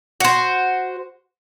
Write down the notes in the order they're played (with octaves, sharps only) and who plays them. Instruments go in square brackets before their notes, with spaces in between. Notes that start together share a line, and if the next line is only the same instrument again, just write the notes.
[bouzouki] F#4 C5